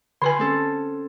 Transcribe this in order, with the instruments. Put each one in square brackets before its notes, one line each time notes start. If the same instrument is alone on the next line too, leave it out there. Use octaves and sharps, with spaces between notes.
[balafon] D3 B4 G#5 [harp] C6
[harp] C4 C#4 A4